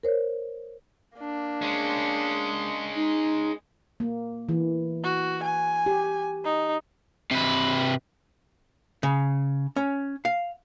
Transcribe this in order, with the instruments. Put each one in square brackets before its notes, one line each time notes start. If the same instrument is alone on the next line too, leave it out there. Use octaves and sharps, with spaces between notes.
[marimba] A#4 C5 C#5
[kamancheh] A#3 D4
[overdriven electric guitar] G#3 C#4
[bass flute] D#4
[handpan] A#3
E3
[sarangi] F#4
G#5
[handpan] G4
[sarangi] D#4
[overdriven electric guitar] C3 B4
[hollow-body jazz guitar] C#3
C#4
F5